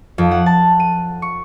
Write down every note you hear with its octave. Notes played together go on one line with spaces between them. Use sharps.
F2
F#5
A5
D#7
C#6